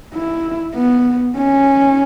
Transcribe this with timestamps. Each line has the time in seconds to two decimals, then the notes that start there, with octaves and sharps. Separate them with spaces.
0.14 E4
0.75 B3
1.36 C#4